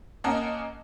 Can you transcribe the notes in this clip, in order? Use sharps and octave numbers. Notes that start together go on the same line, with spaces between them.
A#3 C#4 D#5 F#5 A5